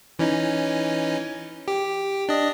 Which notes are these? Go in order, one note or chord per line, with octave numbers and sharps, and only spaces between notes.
E3 C#4 D#4
G4
D4 D#5